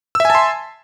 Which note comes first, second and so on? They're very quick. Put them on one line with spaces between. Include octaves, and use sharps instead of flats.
E6 E5 G#5 A5 C6